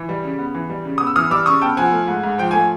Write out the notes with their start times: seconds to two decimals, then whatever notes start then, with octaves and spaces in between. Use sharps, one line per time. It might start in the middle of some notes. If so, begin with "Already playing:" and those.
Already playing: E3
0.09 G3
0.24 C#3
0.39 B3
0.54 E3
0.70 G3
0.85 C#3
0.98 B3 D#6
1.07 E6
1.16 E3 D#6 F6
1.31 G3 D6 E6
1.46 C#3 C#6 D#6
1.61 B3 G5 A5
1.77 F3 F#5 G#5
1.92 A3
2.08 G#2
2.23 G#2
2.38 F3 G5
2.51 A3 G#5